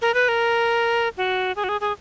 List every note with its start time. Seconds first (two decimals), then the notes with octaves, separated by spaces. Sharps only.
0.02 A#4
0.14 B4
0.28 A#4
1.17 F#4
1.56 G#4
1.64 F#4
1.69 G#4
1.81 G#4